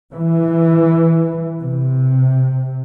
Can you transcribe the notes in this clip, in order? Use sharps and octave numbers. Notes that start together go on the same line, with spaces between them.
E3
C3